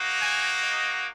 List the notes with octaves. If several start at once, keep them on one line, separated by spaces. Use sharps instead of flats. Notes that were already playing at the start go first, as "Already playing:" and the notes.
Already playing: A#3 D#4 F#4
G#5
D#5